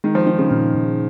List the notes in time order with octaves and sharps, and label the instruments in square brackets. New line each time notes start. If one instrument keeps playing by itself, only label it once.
[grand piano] D#3 [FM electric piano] G#3
[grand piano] F3
[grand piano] D#3 [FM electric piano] D#4
[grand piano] C#3
[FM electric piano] A#2 [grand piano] D#3
[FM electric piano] A#2